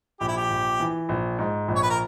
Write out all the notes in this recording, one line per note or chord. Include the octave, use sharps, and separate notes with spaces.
A#1 G4
E4
G4
A#1
E3
A#1
G#2
A#1
C#5
B4
A#4